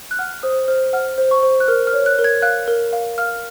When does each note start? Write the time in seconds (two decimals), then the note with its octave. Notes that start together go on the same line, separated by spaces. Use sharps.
0.11 F#6
0.18 F#5 F6
0.43 C5 D#6
0.68 C5 F6
0.93 F#5 F6
1.18 C5
1.31 C#6
1.43 C5
1.60 F#6
1.68 A#4 F6
1.87 F6
1.93 C#5
2.06 F#6
2.19 A#4
2.24 G#6
2.42 F5 F#6
2.68 A#4
2.93 F5
3.18 F5 F6